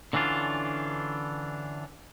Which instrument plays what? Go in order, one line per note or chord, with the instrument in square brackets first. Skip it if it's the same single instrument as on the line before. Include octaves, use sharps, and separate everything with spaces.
[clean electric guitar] D3 E3 C#4 D4 F4